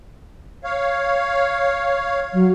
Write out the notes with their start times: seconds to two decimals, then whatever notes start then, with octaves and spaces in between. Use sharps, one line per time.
0.64 C#5 F5
2.33 F#3